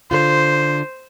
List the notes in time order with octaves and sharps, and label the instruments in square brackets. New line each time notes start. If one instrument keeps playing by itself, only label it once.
[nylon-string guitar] D3 F4 [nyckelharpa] C5